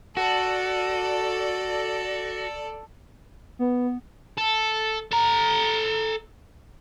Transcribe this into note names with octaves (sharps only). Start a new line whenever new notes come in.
F#4 A4 D5
B3
A4
A4 A#5